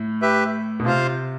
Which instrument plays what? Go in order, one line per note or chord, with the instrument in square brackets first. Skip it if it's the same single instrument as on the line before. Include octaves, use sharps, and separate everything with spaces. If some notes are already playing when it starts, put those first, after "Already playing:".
Already playing: [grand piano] A2
[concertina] G4 B4 E5
[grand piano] B2
[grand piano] C3 [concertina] F4 C5 F5